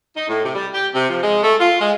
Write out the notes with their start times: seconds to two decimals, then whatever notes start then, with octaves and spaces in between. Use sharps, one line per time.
0.16 D#4
0.29 A2
0.44 C3
0.55 G3
0.73 G4
0.95 C3
1.09 F3
1.23 G#3
1.44 A3
1.60 F4
1.81 G#3